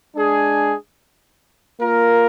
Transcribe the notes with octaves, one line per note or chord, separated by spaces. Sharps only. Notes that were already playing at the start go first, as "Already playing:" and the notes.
G#3 D4 G#4
A#3 F4 A#4